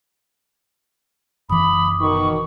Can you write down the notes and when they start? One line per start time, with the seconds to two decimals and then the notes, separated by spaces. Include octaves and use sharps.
1.50 F#1 E3 B5 D6 D#6
2.00 B2 D#3 C#6